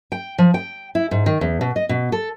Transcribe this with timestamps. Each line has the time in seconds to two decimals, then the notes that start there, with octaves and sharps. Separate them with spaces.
0.12 G5
0.38 F3
0.54 G5
0.95 E4
1.11 G#2
1.26 D#3
1.41 E2
1.61 B2
1.76 D#5
1.89 B2
2.12 A4